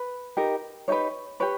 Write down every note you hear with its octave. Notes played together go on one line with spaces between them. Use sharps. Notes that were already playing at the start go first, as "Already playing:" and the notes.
Already playing: B4
D#4 G4 A#4
D#4 G4 B4 C#5
G4 B4 C#5